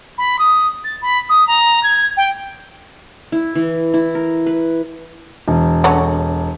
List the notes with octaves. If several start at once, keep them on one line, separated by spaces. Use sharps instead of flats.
B5
D#6
A6
B5
D#6
A#5
G#6
G5
E4
E3
E4
A#4
B4
E1
D3 F#3 C#4